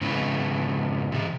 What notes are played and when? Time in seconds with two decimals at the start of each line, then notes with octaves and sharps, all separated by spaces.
0.01 G#2 C#3 B3 E4
1.12 C3 E3 E5